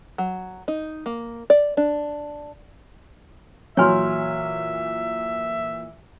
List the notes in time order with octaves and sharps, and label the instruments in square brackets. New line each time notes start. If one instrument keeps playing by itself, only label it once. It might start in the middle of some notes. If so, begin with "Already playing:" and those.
[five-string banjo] F#3
D#4
A#3
D5
D4
[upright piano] A#2 E3 [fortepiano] F#3 F6 [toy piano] C#5 G#5 C6 [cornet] E5